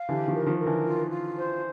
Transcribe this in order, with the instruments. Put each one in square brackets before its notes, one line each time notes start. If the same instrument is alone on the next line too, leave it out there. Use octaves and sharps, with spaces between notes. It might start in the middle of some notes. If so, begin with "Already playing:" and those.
Already playing: [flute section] F5
[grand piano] D3 E3 [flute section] G4
[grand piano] D#3 F3
[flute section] A#4
[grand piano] D#3 F3
[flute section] A#4
[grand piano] D3 E3
[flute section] F4
F4
C5